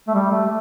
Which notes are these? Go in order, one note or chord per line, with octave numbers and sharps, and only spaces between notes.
A3
G3
A3
A3